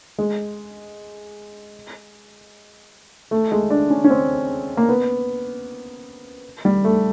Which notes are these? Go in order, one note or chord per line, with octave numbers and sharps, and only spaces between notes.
G#3
A3
G#3
D4
C#4
C#4
C4
A#3
B3
G3
A3